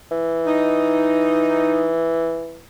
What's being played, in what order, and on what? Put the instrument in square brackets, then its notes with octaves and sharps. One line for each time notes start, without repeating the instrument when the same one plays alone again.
[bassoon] E3
[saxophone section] D#4